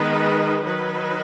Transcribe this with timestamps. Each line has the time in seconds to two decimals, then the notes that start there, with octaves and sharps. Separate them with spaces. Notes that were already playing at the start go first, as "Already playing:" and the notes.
Already playing: D#3 G#3 B3 D#4 B4
0.63 D#3 F#3 D#4 B4